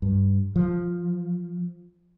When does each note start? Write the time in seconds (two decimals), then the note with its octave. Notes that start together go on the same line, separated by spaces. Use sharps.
0.02 G2
0.56 F3